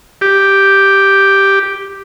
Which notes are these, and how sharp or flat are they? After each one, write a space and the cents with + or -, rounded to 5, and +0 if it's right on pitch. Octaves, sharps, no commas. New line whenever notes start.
G4 +0